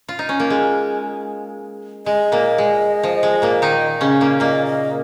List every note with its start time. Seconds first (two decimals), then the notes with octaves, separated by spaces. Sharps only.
0.08 F4
0.19 D#4
0.29 C#4
0.40 A#3
0.50 G#3
2.06 G#3 D#5
2.32 A#2 A#3
2.58 G#3
3.03 F3
3.23 G#3
3.42 A#2 A#3
3.62 D#3 D#4
4.01 C#3 C#4
4.21 A#2 A#3
4.40 A#2 A#3 D#5
4.66 D#5